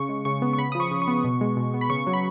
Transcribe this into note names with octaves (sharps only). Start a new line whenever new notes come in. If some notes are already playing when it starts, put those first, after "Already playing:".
Already playing: C#3 C#6
G#3
C#3 C#6
B3
C#6
C#3 B5
F3 D#6
C#6
C#3
C#6
B3
B2
G#3
B2
B3
B5
C#3 C#6
F#3
B5